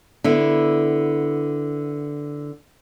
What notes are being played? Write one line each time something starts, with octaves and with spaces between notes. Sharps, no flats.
D3 B3 E4